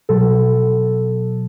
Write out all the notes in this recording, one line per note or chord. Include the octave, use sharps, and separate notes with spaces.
B2 F#3 A4